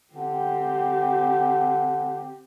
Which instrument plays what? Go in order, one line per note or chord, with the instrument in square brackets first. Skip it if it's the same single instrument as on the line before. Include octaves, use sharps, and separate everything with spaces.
[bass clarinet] D3 [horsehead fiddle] C4 G4